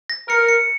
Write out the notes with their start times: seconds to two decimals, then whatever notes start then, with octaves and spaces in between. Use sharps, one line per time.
0.10 A#6
0.29 A#4 C#7
0.49 C#7